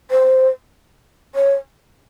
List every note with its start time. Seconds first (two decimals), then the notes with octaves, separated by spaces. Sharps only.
0.11 C5
1.35 C#5